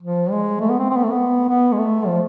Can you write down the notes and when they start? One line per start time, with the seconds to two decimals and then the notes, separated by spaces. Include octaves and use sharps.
0.02 F3
0.31 G#3
0.60 A3
0.70 B3
0.79 C4
0.90 C4
0.97 B3
1.04 A3
1.11 B3
1.49 B3
1.72 G#3
1.78 A3
2.07 F3